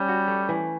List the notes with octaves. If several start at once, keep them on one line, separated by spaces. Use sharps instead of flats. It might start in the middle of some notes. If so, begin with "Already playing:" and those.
Already playing: G3 C#4
F#4
A3
E3